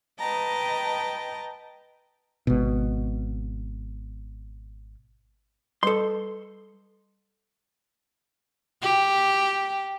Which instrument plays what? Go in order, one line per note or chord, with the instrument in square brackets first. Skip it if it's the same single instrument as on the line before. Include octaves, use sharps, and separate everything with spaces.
[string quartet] B4 D#5 G5 A5 A#5
[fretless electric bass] G#1 B2
[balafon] G3 B4 [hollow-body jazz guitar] A4 C6
[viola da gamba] G4